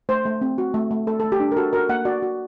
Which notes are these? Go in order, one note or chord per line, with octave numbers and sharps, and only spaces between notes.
A3 C5
A3
C4
F#4
A3
A3
A3 A4
A4
A3
G4
D4
A#4
F#4 A4
F#4 A#4
A#3 F#5
F#4 D5
F#4